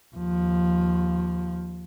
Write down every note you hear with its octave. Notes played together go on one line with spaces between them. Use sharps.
D#2 F3